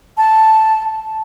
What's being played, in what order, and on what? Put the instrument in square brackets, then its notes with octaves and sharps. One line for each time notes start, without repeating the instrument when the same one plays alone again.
[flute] A5